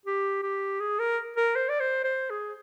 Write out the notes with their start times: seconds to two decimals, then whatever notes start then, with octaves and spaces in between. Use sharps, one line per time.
0.06 G4
0.43 G4
0.80 G#4
0.99 A#4
1.37 A#4
1.56 C5
1.69 D5
1.80 C5
2.04 C5
2.30 G#4